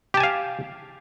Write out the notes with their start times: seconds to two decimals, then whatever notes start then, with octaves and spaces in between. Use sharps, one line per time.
0.14 G4
0.17 A5
0.20 G#5
0.23 F5